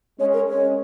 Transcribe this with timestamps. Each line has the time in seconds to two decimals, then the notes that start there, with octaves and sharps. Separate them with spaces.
0.19 G#3 C#4 C#5
0.33 A#4
0.48 G#3 C#4 C#5